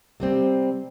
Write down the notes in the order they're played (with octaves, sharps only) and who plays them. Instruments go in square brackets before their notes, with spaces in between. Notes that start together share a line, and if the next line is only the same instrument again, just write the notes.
[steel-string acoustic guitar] C3 G3 C4